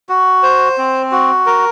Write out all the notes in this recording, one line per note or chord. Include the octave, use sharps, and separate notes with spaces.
F#4
C5
C4
F#4
A#4